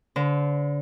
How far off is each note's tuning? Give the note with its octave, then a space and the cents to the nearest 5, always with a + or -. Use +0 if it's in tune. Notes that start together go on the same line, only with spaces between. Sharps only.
D3 -30 C5 -30